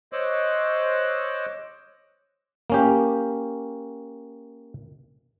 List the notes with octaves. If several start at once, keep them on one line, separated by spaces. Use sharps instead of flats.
C5 C#5 D#5 D6 E6 F#6
A#3 C#4 G4